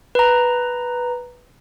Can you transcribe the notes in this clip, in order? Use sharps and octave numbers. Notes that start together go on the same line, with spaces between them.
B4 A#5